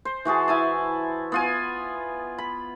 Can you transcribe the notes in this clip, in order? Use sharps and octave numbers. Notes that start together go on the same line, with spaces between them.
C5
E3 F#4 G#4 A5
E4 G#5 A5
B3 F4 G#5
B5